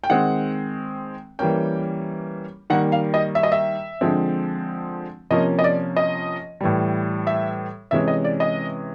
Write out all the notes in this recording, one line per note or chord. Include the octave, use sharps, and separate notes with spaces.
G5
D#3 G#3 C4 F#5
E3 G3 A#3 C#4 G5
D#3 G3 A#3 F#5
F5
D#5
E5
D#5
E5
D3 F3 G#3 C4
C3 F3 A#3 C#4 D#5
D#5
D5
D#5
A2 E3 G3
E5
C3 E3 G#3 C#4 E5
D#5
D5
D#5